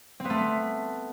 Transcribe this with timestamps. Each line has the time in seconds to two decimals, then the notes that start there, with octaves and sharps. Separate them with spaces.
0.20 C4
0.25 B3
0.30 A3